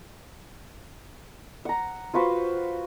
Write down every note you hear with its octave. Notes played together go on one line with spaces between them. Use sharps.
F#5 A#5
F4 F#4 B4 C5